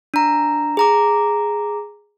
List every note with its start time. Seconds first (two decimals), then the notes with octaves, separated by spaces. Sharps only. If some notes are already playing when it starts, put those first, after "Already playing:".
0.14 D4 A#5
0.77 G#4 A#5 D6